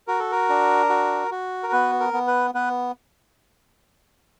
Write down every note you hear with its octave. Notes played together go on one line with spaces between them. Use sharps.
F#4 A#4
A4
A#4
D4
F#4
F#4
A#4
B3 B4
A#4
B3
B4
B3 B4